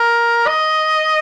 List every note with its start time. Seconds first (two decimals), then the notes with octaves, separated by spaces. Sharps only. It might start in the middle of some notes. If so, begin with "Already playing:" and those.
Already playing: A#4
0.47 D#5